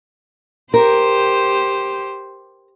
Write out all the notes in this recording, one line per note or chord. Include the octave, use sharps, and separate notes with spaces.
G4 A#4 C5